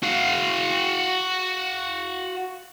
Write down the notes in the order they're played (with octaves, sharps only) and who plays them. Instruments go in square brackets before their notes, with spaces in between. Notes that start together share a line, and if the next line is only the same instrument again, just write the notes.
[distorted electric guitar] F#4 F5